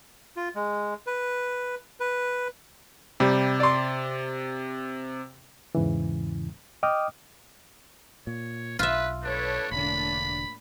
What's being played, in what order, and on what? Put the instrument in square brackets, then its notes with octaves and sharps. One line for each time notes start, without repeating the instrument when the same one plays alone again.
[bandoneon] F4
G#3
B4
B4
[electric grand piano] C3 [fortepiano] G3
[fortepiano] D5 C6
[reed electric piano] E2 G#2 C#3 E3
D#5 G5 D6 D#6 F6
[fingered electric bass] A#2 [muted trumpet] C#5
[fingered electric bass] B1 [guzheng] F4 E5 [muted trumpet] B4
[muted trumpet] D4 [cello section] A4 B4 C#5
[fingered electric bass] E1 D3 [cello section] A2 A#3 D4 [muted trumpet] B5